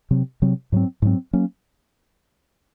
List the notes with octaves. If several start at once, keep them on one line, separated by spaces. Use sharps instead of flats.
C3 F#3 C4
C3 F#3 C4
G#2 F#3 C4
G#2 F#3 C4
F#3 A#3 C#4